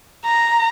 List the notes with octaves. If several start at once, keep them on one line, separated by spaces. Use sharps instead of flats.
A#5